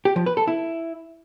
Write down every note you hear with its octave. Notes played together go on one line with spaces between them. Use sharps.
G4
F3
B4
A4
E4